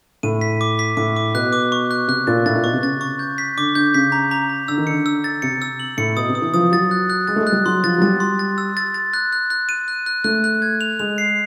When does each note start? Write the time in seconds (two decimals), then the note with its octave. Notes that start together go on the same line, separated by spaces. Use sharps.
0.23 A2 D#7
0.41 B6
0.61 D6
0.79 B6
0.97 A2 D6
1.16 D6
1.34 B2 F#6
1.53 D6
1.72 C#6
1.91 F#6
2.08 C3 F#6
2.27 A#2 A6
2.46 A2 A6
2.56 A#2
2.64 B2 C#6
2.73 C3
2.83 C#3 A6
3.01 C#6
3.19 G6
3.38 B6
3.57 D3 D6
3.75 D3 G6
3.94 C#3 B6
4.12 A#5
4.31 A#5
4.49 A#5
4.68 D3 E6
4.78 D#3
4.87 D3 C#7
5.06 E6
5.24 A6
5.42 C3 C#7
5.62 E6
5.80 F#7
5.98 A2 C#7
6.16 B2 D#6
6.29 C3
6.35 D#6
6.42 E3
6.54 F3 D#6
6.72 F#3 A6
6.91 F#6
7.10 F#6
7.27 G#3 A6
7.36 A3
7.40 G#3
7.47 F#6
7.52 G3
7.66 F#3 C6
7.84 F3 A6
7.98 F#3
8.02 G3 A6
8.20 C6
8.39 A6
8.58 E6
8.77 A6
8.94 A6
9.14 F#6
9.32 F#6
9.50 F#6
9.69 D#7
9.88 F#6
10.06 F#6
10.24 A3 F#6
10.44 F#6
10.62 G#6
10.81 F7
10.99 G#3 F7
11.18 C7